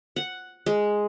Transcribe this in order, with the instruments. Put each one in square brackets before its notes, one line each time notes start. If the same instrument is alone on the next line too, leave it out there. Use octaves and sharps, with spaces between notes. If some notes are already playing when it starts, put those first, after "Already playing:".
[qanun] F#5
G#3